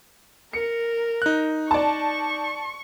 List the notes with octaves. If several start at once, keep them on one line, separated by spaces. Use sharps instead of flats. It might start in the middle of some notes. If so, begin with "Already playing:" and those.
A#4 C#7
D#4 F#6
D5 A5 C#6